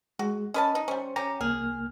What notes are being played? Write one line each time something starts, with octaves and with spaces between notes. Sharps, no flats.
G#3 F#4
C#4 B4 D#5 A5
D#4
G3 C#4 C5
C#4 G4 A#5
C2 A#3 G#4 F6